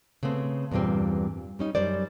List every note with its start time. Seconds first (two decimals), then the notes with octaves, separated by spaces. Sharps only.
0.23 C#3 A3 B3 C4
0.71 E2 G2 A#2 G3 C4
1.59 G3 C#4 D#4
1.75 F#2 G3 C5 D5